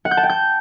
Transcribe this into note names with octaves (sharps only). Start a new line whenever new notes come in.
F#5
G6
A5
G5
G6